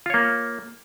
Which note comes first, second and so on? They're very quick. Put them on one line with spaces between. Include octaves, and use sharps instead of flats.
F4 C#5 A#3